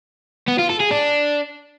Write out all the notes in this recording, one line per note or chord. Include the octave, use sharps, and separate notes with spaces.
B3
F4
A4
G#4
D4